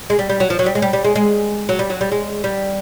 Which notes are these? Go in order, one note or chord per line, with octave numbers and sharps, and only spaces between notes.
G#3
G3
G3
F#3
F3
F#3
G3
G#3
G3
G3
G#3
G#3
F#3
G3
F#3
G3
G#3
G3